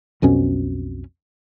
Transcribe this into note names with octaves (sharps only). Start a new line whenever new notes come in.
B1 F2 B2 C#4